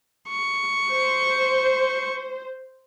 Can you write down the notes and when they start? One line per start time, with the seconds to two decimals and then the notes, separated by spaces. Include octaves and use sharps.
0.29 C#6
0.92 C5